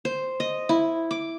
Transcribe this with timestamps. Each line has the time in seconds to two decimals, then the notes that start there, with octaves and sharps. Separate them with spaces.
0.05 C5
0.40 D#5
0.69 E4
1.11 D6